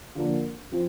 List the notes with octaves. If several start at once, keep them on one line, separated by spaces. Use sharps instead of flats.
D3 F3 A#3 D4
F3 C4 F4